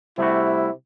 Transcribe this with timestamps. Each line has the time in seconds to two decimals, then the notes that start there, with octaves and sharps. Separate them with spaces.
0.18 C3 G3 A3 E4 F#4